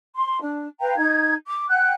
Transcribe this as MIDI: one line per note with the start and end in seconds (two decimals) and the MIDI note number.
0.14 0.39 84
0.40 0.65 62
0.80 0.95 71
0.80 0.95 77
0.80 0.95 79
0.80 0.95 82
0.96 1.33 63
0.96 1.33 92
1.46 1.66 86
1.69 1.94 78
1.69 1.94 79
1.69 1.94 90